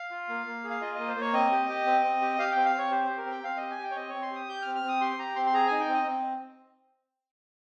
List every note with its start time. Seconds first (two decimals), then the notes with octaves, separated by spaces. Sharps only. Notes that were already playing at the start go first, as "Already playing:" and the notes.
Already playing: F5
0.11 F4
0.29 A#3
0.46 A#3
0.64 G#4
0.70 F5
0.81 F4 D#5
0.95 A#3 D#5
1.08 C5
1.16 A#3 C#5
1.33 C4 D#5
1.51 G4
1.69 G4
1.86 C4
2.03 C4
2.22 G4
2.39 G4 F5
2.52 C4 G5
2.65 F5
2.74 C4 C#5
2.91 G4 C5
3.04 G4 C5
3.18 A#4
3.26 C4 G5
3.43 C4 F5
3.57 G4 D#5
3.70 G#5
3.79 G4
3.84 G5
3.91 C#5
3.96 C4 D#5
4.09 C4 C#5
4.22 C6
4.31 G4 D#6
4.49 G4 G6
4.62 F6
4.66 C4
4.75 F6
4.83 C4 D#6
5.01 G4 C6
5.19 G4 A#5
5.36 C4 C6
5.46 C6
5.54 G#4 A#5
5.67 D#4 G#5
5.80 G5
5.88 C4 D#5
6.07 C4